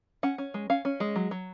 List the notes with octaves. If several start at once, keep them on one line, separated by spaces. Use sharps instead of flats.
C#4 F#5
C#4
G#3
C#4 F5
C#4
G#3
F#3
F#3